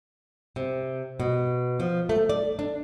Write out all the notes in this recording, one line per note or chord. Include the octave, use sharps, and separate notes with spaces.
C3
B2
F3
A3
D5
D4